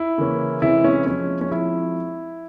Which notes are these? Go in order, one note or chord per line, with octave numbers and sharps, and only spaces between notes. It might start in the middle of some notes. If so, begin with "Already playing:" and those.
Already playing: E4
C#3 E3 A#3 C#4
C3 E3 G#3 C#4 E4
C#4
F3 G#3 C#4
C#4
F3 G#3 C4 E4